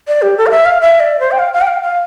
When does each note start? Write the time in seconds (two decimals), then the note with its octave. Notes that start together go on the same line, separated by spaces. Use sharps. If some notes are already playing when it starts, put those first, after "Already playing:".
0.08 D5
0.22 G4
0.38 A4
0.47 F5
0.51 E5
0.65 F5
0.81 E5
1.00 D5
1.20 C5
1.31 G5
1.39 F5
1.54 F5
1.61 G5
1.67 F5
1.83 F5